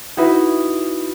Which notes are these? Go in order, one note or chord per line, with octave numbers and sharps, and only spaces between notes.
D#4 E4 F#4 B4